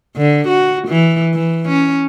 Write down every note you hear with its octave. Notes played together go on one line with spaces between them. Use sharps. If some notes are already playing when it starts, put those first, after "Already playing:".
D3
F#4
E3
E3
C#4